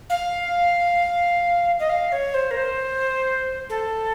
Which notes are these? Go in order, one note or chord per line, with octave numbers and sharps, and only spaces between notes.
F5
D#5
F5
C#5
C5
A#4
C5
A4